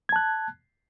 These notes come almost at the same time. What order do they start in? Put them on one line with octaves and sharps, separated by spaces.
G#6 A5 F#6